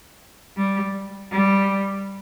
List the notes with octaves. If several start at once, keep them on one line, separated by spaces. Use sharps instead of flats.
G3
G3